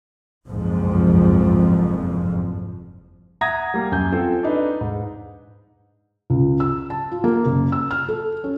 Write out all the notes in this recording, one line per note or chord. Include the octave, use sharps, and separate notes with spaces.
F#1 C2 F2 G#2 F3
E5 F#5 A#5 D#6 G#6 A#6
G3 A#3
F#2 G#5 G6
C4 F4 A4 C5
D4 D#4 B4 D#5
G#2
C#2
E6
A5
F4
A#3
F#1
E6
F6
A4
C#4